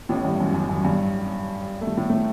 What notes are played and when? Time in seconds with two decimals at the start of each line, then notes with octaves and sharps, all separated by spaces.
0.09 A1 A2
0.25 G2
0.40 F#2
0.54 F#2
0.69 F#2
0.85 G2
1.81 A3
1.86 G2 G3
1.97 A2 A3
2.10 A2 A3